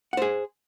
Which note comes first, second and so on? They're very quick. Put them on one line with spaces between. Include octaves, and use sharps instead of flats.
F#5 C5 G#4